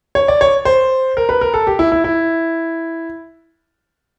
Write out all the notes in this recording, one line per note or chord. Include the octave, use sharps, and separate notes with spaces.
C#5
D5
C#5
C5
A#4
B4
A#4
A4
G4
E4
E4
E4